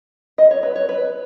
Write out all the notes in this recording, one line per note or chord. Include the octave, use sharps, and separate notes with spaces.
D#5
C#5
B4
C#5
B4